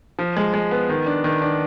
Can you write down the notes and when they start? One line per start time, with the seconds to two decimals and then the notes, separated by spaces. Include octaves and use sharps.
0.19 F3
0.36 G#3
0.54 G#3
0.71 B3
0.89 D#3
1.06 D4
1.24 D#3
1.42 D4